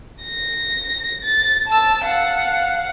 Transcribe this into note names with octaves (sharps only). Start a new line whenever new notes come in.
A#6
A6
A5 E6
F5 F#5